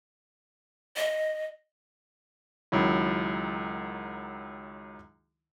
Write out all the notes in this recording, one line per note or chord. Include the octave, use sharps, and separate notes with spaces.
D#5
C#2 D#3 F#3 E4